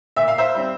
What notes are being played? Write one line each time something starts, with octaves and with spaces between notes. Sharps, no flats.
A#2 E5
F5
C5 E5
G3 C4